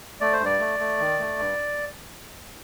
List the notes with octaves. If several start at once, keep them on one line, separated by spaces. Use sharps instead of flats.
A3 D5
C5
G2
D5
A3
A3
D#3
A3
G2